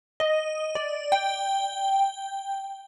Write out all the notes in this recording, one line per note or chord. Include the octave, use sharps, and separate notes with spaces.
D#5
D5
G5